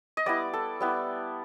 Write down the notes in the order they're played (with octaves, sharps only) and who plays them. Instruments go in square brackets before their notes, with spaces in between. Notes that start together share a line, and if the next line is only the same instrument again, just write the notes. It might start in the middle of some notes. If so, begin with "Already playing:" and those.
[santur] D#5
G3 B3 E4 D5
A4
G3 B3 E4